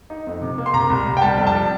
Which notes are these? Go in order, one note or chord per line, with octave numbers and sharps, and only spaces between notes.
D#4
F2
C3
A#3
C6
C3 A#5
C2
C2
G5
G3 A5
F2
A5
G3